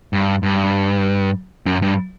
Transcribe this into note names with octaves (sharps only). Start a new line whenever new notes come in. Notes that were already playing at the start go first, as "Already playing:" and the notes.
G2
G2
F#2
G2